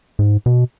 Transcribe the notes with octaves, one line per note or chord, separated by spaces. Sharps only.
G#2
B2